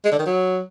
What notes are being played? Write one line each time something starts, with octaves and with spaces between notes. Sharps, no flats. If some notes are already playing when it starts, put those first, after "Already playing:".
G#3
D3
D#3
F#3